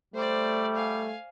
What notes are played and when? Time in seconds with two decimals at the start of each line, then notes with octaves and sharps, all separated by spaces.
0.14 G3 A3 C5 D5
0.75 F5 G#5